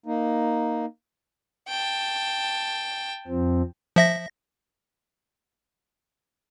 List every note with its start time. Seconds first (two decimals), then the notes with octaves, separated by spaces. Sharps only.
0.06 A#3 D#4
1.69 G5 A5
3.28 F2 F3 C4
3.96 F3 E5 A#6